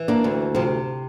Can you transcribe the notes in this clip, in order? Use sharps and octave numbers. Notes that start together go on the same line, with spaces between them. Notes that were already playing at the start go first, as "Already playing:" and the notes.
Already playing: E3
A#3 D4
D2
C3 F3